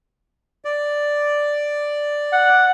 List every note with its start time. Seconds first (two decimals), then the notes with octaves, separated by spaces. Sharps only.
0.65 D5
2.33 F#5